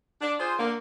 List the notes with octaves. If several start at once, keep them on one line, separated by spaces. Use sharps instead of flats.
D4
F4 G#4 C5
D3 A#3